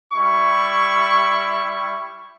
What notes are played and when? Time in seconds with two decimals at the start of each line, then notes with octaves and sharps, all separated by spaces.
0.13 G3 E4 C#6